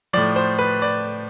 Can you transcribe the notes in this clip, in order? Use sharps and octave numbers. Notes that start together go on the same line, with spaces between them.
A2 F3 D5
C5
B4
D5